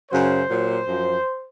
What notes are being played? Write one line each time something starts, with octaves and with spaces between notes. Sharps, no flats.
F#2 C#3 F#3 C5
A#2 F#3
F#2 F3